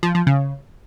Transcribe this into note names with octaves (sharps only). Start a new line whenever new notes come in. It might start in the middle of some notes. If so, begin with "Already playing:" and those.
F3
F3
C#3